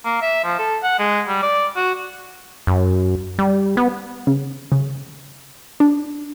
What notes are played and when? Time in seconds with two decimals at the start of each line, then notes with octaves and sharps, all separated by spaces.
0.05 A#3
0.22 E5
0.44 F3
0.59 A4
0.83 F#5
0.99 G#3
1.27 G3
1.43 D5
1.76 F#4
2.67 F#2
3.39 G3
3.77 B3
4.27 C#3
4.72 C#3
5.80 D4